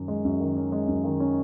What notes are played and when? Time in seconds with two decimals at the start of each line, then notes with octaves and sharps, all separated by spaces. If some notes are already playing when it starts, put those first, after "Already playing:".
Already playing: F#2 D#3 C#4
0.08 G#3
0.25 F#2
0.40 D#3
0.57 C#4
0.72 G#3
0.88 F#2
1.04 D#3
1.20 C#4